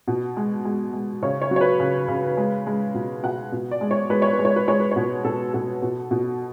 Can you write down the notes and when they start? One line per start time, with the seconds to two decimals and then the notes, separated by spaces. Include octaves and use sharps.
0.08 B2
0.37 G#3
0.65 G#3
0.93 G#3
1.22 C#3 C#5
1.42 C#5
1.51 F#3
1.56 C#5
1.61 B4
1.80 C#3
2.08 C#3
2.37 G#3
2.67 G#3
2.95 B2
3.23 B2 F#5
3.52 B2
3.71 D5
3.81 G#3
3.91 C#5
4.10 G#3 B4
4.22 C#5
4.33 B4
4.39 G#3
4.45 C#5
4.56 B4
4.68 G#3 C#5
4.80 B4
4.91 B2 C#5
5.03 B4
5.24 B2 A4
5.54 B2 A4
5.82 B2
6.11 B2